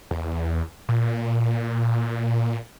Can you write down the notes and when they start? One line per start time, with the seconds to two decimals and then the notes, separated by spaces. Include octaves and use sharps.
0.11 E2
0.89 A#2